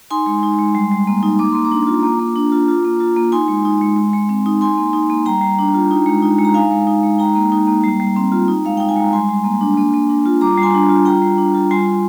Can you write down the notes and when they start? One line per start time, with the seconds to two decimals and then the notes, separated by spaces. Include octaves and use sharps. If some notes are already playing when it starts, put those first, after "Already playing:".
0.11 D#4 G#5 C6
0.26 G#3
0.43 D#4
0.59 G#3
0.75 G3
0.91 G3
1.07 A#3
1.23 D#4
1.39 A#3 D6
1.52 A#3 C6
1.65 A#5 D6
1.72 D4
1.87 F4
2.03 A#3
2.20 A#3
2.36 D4
2.52 F4
2.68 F4
2.85 A#3
3.00 F4
3.16 A#3
3.32 D#4 G#5 C6
3.48 G#3
3.65 D#4
3.81 G#3
3.97 G#3
4.13 G#3
4.29 C4
4.46 D#4
4.61 D#4 G#5 C6
4.77 A#3
4.93 D#4
5.10 A#3
5.26 G3 G5 A#5
5.41 G3
5.59 D4
5.74 F4
5.91 D#4
6.06 G#3
6.22 D#4
6.39 G#3
6.45 A#5
6.54 D#4 F5 G#5
6.71 G#3
6.87 D#4
7.03 G#3
7.19 D#4 G5 A#5
7.36 A#3
7.52 D#4
7.67 A#3
7.84 G3
8.00 G3
8.17 C4
8.32 F4
8.48 D#4
8.65 G#3 F5
8.77 D#4 G5
8.89 G#5
8.96 G#3 A#5
9.13 G3 G#5 C6
9.29 G3
9.44 A#3
9.61 D4
9.77 A#3
9.94 A#3
10.09 D4
10.26 F4
10.41 G3 A#5 D6
10.58 G3
10.63 G#5 C6
10.74 D4
10.89 F4
11.05 G3 G5 A#5
11.22 G3
11.38 D4
11.55 F4
11.71 G3 G#5 C6
11.86 G3